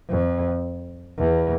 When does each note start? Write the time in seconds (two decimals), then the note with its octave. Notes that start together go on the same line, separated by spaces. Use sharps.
0.10 F2
1.18 E2